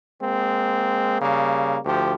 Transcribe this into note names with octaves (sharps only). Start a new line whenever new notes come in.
G#3 A#3 C4
C#3 G3 A#3
D2 F3 G4